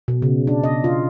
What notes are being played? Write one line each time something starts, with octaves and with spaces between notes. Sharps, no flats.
B2
C#3
D4
D#5
F4